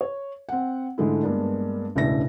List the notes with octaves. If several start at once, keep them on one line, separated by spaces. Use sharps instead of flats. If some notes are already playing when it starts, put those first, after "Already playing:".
C#5
C4 F#5
G#2 D3 G#3 A3 E4
G2 G#3 A#3 B3 D4
E1 C#2 A2 D4 E5 A#6